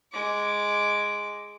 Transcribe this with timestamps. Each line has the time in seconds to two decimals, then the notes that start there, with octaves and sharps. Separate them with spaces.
0.12 G#3 D6